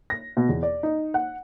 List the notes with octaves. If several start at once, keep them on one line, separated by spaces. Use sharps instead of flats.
A#6
B2
E2
D5
D#4
F#5